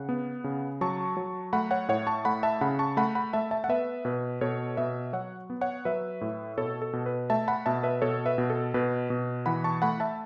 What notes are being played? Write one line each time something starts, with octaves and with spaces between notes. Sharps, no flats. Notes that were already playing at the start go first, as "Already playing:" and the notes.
Already playing: C#3 F#5
B3
C#3
F#3 A5 C#6
F#3
A3 F#5 B5
C#5 F#5
A2 C#5 F#5
A5 C#6
A3 F#5 B5
E5 A5
C#3 F#5 B5
A5 C#6
A3 F#5 B5
F#5 B5
A3 E5 A5
E5 A5
F#5
B3 B4 E5
B2 B4
B2 A4 C#5
B2 B4 E5
F#3 C#5 F#5
B3
C#5 F#5
F#3 B4 E5
A2
B2 A4 C#5
A4
B2
B4
A3 E5 A5
F#5 B5
B2 E5 A5
B4 E5
B2 A4 C#5
B4 E5
B2
A4
B2 B4
B2
E3 F#5 B5
A5 C#6
A3 F#5 B5
E5 A5